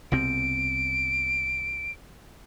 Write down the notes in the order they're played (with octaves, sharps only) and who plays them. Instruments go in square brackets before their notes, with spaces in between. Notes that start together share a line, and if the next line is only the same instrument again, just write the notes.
[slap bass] C2 B2 C4 [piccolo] D7